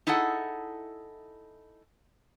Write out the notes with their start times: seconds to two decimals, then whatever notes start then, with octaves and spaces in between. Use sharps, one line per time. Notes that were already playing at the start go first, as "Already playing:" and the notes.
0.07 D#4 E4 G#4 A4 F#5